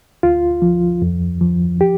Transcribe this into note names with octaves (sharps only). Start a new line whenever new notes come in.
D2 F4
F3
F2
F3
G4